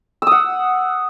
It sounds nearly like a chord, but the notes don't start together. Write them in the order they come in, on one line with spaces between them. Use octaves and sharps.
E6 D#6 F#5